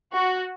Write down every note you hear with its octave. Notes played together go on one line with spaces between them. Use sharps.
F#4